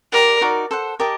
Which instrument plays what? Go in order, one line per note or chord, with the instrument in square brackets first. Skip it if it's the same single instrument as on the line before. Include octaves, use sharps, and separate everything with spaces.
[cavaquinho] G4 D5 F#5 [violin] A#4
[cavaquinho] D#4 F#4 A#4 D5
A4 C5 F#5
G4 A#4 D#5 A5